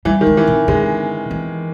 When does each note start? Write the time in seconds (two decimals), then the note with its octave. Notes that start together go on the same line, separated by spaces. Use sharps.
0.05 E3 G3
0.21 D#3
0.27 G#3
0.37 E3
0.47 D#3
0.68 D3 G#3
1.31 E3